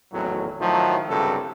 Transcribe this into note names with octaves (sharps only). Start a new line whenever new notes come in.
G#1 E2 A2 F#3
A2 D#3 F3 F#3
C2 G2 C#3 F#3 A4